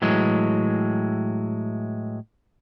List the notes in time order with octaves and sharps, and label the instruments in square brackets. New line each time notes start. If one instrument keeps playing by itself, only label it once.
[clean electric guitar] A2 E3 F#3 G#3